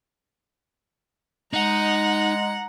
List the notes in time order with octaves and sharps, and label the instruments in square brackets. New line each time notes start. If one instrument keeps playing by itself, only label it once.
[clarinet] G#3 [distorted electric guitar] D#4 [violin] F#5 [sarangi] A#5